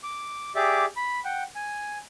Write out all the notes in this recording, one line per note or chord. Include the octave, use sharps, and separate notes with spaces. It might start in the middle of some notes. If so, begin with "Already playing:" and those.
D6
G4 G#4 D5 E5 D6
B5
F#5 G5
G#5